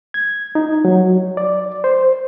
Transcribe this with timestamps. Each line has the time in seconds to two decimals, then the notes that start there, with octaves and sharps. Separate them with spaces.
0.14 G#6
0.55 D#4
0.85 F#3
1.37 D5
1.84 C5